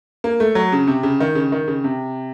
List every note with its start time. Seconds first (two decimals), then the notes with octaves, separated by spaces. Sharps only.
0.24 A#3
0.40 A3
0.55 F#3
0.72 C#3
0.87 C3
1.03 C#3
1.20 D#3
1.35 C#3
1.52 D#3
1.67 C#3
1.84 C3